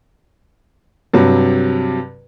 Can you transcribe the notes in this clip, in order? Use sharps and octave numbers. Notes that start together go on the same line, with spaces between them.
G2 C3 F#3